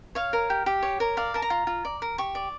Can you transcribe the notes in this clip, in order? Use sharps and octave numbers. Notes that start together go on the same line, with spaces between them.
C#5 F5
A#4
G4
G4
C#5
A#4
D5 F5
A#4 A5
A#5
F4
F4
D5
A#4
G4 C#6
D5